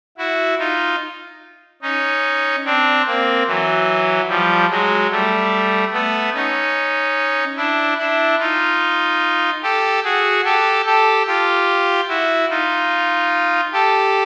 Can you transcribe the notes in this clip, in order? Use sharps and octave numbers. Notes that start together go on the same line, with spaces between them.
E4 F#4
D#4 F4
C#4 D#4
C4 D4
A#3 C4
E3 F#3
F3 G3
F#3 G#3
G3 A3
A3 B3
C#4 D#4
D4 E4
D4 E4
D#4 F4
G4 A4
F#4 G#4
G4 A4
G4 A4
F4 G4
E4 F#4
D#4 F4
G4 A4